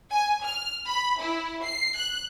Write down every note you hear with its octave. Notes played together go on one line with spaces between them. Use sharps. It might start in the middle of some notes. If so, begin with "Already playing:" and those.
G#5
F6
B5
E4
C7
F#6